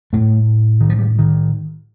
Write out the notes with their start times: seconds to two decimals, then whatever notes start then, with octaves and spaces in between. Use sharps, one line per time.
0.13 A2 A3
0.81 D#3
0.90 F3
0.98 G3
1.18 D#3